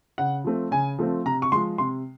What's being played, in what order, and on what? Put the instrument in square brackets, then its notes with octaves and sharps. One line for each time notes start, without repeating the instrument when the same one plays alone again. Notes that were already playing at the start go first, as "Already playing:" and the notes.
[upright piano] C#3 F#5
F3 A3 C4
C#3 G#5
F3 A3 C4
C3 A#5
C#6
F3 G#3 C6
C3 C6